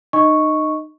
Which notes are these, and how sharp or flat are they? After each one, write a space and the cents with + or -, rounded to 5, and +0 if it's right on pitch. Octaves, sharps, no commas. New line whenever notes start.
D#4 -30 D#5 +10 C#6 +0